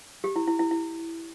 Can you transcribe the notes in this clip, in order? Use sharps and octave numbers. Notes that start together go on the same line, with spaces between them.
G4
E4
E4
E4
E4